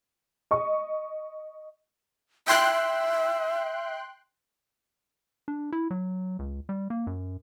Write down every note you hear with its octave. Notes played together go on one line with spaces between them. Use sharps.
D#5 C#6
E5 G5 C6 F#6
D4
E4
F#3
C#2
G3
A#3
F#2